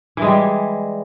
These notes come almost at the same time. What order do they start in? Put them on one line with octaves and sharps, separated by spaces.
E3 G#3 G3